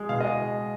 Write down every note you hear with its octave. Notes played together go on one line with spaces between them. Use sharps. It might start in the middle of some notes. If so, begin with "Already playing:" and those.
Already playing: G#3
B2 F5
D#5
G#3